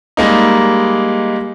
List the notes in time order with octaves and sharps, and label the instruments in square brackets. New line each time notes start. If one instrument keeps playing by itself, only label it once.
[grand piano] G3 G#3 A#3 D#4